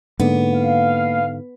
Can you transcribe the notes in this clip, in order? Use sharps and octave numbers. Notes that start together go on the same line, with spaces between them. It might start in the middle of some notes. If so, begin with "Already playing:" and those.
G#2 D3 A#3 B3
F5